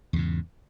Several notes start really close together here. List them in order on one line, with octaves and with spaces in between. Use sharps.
E2 C#3 G#2